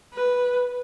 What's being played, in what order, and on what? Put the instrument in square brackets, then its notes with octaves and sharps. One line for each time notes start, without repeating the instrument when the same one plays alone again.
[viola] B4